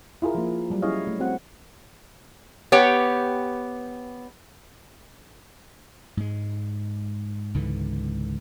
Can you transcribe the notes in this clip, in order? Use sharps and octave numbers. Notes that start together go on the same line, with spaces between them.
E4 F4 G#4 A#4
F3 A#3
F#3 G3
C#4 E4 G#4 C#5 D#5 F5
A3
C4 F#4 F#5
B3 G4 C#5 G5
G#2 G#3
C#2 G#2 D3 E3